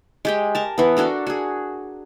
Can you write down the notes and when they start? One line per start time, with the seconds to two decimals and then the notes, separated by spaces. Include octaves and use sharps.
0.25 G#3 G4 G5
0.55 A#4 A5
0.78 E3 B3
0.97 D4 F#4 A4 A#4
1.27 F#4 G#4